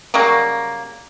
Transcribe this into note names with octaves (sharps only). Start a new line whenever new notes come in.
C#3 F#3 G3 A#3